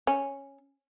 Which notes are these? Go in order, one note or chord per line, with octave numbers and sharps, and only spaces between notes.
C#4